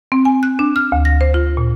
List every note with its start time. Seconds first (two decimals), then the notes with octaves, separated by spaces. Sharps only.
0.12 C4
0.25 G#5
0.43 F#6
0.59 D4
0.76 F6
0.92 D2
1.05 A#6
1.21 C5
1.34 F4
1.57 A#2